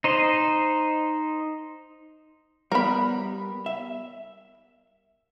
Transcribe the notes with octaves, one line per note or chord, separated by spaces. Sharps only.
D#4 C5 D#5
G3 B3 A#4 B5
E5